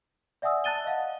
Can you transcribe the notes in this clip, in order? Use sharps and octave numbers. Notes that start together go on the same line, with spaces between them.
D5 E5 F#5 G#5 D#6 E6
A5 F#6 A6 D#7 G7
D#5 F5 F#5